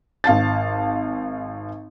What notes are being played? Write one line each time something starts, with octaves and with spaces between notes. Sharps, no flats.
G#1 F5 A5 A6